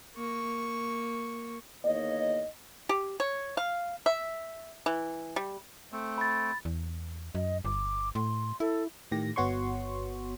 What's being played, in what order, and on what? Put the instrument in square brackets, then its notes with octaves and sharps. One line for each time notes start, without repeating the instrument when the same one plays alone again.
[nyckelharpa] A#3 C#6
[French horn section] E2 D#3 A#3 D#4 C#5 D#5
[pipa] G4
C#5
F5
E5
E3
G3
[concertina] A3 C4
[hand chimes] B5 A6
[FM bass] E2
[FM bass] F#2 [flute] D#5
[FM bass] G1 [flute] D6
[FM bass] A2 [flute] C6
[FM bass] E4 [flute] A4
[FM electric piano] A2 D#3 G4 A#6
G1 B3 F#4 C#5 C6 C#6